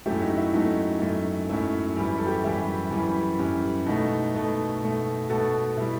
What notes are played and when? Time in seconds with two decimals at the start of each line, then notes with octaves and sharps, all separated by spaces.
0.06 F#2 F#3 A3 E4 G4
0.21 D#4 F#4
0.37 E4
0.53 F#2 F#3 A3 D#4
1.01 F#2 F#3 A3
1.49 F#2 F#3 A3 E4
1.97 F#2 E3 G3
2.18 A4
2.27 G4
2.36 F#4
2.44 F#2 E3 G3 E4
2.91 F#2 E3 G3
3.39 F#2 E3 G3
3.86 B2 A3 D#4 F#4
4.34 B2 A3
4.82 B2 A3
5.29 B2 A3 F#4 A4
5.77 B2 G3 E4